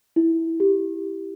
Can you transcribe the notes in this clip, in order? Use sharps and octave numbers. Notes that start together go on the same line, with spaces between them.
E4
G4